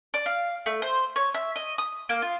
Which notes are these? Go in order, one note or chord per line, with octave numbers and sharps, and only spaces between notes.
D5
F5
A3
C5
C#5
E5
D#5
D#6
A#3
F4